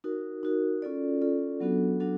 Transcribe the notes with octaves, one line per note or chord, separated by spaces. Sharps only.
D#4 F#4 A#4
D#4 F#4 A#4
C#4 F4 A4 D5
C#4 F4 A4 D5
F#3 B3 D4 F#4 A4
F#3 B3 D4 F#4 A4